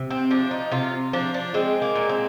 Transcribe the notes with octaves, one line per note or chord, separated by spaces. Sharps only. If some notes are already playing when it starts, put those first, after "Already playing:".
Already playing: C3
C4
F3 D4
D#4
C3 F4
F3 D4
D4
G#3 C4
A#3
A#2
C4